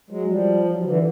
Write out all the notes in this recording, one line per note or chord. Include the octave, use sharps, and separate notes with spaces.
F#3 G#3
F3 G3
G3
F#3
F3
D3 E3